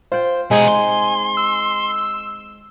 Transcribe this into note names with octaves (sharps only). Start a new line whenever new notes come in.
F4 C5 G5
B2 G#3 C4 D#4 G#4 G#5
C6
E6